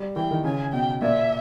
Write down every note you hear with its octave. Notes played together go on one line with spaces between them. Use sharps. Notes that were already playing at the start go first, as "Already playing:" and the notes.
Already playing: G3
E3 G5
D#3
C#3 G#5
B2 G5
A#2 E5